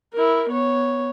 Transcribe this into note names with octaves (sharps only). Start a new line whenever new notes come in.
E4 A#4
B3 C#5